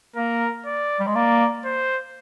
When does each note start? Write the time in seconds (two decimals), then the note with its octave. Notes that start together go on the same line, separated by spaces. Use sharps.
0.16 A#3 A#4
0.66 D5
0.99 G3
1.07 G#3
1.15 A#3 D5
1.65 C5